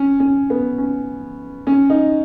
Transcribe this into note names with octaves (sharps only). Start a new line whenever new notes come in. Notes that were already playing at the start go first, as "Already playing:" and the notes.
Already playing: C#4
C#4
B3
C#4
C#4
D#4